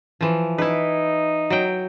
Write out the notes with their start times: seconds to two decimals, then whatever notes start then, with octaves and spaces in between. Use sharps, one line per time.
0.21 E3 F3
0.58 D#4 E4 B4
1.50 F#3 G5